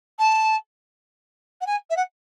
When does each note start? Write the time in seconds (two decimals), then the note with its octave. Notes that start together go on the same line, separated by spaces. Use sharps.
0.19 A5
1.61 F#5
1.67 G#5
1.90 E5
1.97 F#5